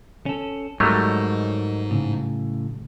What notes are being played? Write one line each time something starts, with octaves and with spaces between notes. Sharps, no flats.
C#4 A4
G#2 F#3 G3 A3 A#4 C#5 D#5
A2 C#3